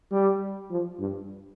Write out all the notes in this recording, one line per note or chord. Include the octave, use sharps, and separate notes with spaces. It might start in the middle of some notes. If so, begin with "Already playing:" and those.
G3
F3
G2